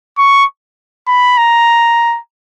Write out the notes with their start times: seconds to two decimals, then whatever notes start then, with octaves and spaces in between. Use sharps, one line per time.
0.18 C#6
1.08 B5
1.38 A#5